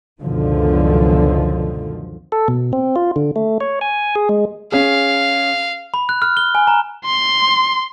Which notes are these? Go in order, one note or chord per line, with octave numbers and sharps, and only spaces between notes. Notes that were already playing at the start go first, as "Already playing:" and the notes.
C#2 F#2 B2 D3 D#3 F3
A4
B2
C4
F4
D3
A3
C#5
G#5
G#4
G#3
C#4 G#4 F5
B5
F#6
F6
G7
G#5
A#5
C6